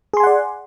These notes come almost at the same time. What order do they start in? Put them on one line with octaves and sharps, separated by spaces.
G#4 C6 G#5 F#5 D5